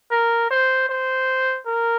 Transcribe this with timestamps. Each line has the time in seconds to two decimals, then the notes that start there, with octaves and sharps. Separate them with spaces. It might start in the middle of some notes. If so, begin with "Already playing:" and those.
0.11 A#4
0.51 C5
0.89 C5
1.66 A#4